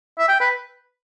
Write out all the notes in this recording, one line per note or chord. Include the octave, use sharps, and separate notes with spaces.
E5
G5
B4